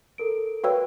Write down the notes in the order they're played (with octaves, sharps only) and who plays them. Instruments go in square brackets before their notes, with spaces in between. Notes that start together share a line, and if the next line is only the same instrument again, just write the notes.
[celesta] A4 A#4 D7
[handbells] F#4 B4 C#5 [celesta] F5 G5 E6